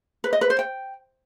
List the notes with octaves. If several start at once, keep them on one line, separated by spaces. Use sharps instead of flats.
B4
D#5
B4
C5
G5